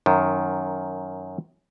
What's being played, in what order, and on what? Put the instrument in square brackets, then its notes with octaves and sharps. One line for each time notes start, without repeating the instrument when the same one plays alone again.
[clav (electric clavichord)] F#2 D#3